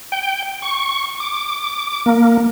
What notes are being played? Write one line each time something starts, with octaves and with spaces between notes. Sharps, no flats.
G5
C#6
D6
A#3